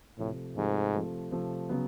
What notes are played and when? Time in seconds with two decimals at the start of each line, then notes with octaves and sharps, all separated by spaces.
0.19 A2 C3 F3 A3
0.56 G#2 C3 F3 A3
0.94 C3 F3 A3
1.31 C3 F3 A3
1.69 C#3 F#3 B3